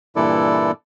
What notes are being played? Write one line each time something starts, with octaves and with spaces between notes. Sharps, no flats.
G2 A#2 E3 E4 A4 D5